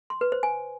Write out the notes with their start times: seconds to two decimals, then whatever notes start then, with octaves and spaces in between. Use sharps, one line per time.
0.10 C6
0.21 B4
0.32 C5
0.43 G#5